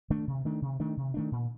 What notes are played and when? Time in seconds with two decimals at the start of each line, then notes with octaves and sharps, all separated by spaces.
0.10 D#3 A3 D4
0.27 C3
0.45 D#3 A3 D4
0.62 C3
0.80 D#3 A3 D4
0.97 C3
1.14 D#3 A3 D4
1.32 A#2